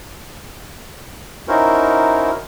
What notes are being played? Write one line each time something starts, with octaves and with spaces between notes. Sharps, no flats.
C#4 D#4 E4 F#4 A#4 C5